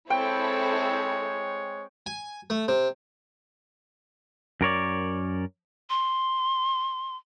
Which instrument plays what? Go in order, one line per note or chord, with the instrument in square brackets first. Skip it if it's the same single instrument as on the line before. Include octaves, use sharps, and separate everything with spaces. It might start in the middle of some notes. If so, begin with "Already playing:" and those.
[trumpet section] G#3 C#5 [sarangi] C4 [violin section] E4 A4 [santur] G5
[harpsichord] G#5
A3
C3
[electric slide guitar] F#2 A#4 C#5 D5
[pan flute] C6